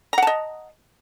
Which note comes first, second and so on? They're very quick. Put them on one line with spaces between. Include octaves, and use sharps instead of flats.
A#5 F#5 A5 D#5